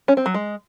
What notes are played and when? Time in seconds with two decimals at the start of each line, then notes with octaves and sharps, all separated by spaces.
0.08 C#4
0.17 C4
0.26 F#3
0.34 G#3